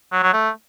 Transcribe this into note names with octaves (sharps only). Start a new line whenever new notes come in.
F#3
F#3
A3